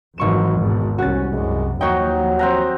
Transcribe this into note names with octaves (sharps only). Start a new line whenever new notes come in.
G#1 F2 E3 F#3 C#6 E7
E2 G#2 B2
C2 C#4 F#4 A6
C2 F#2 G#3
D#2 F3 F#3 D#4 F#4 C#5 G5
C4 F#5 A#5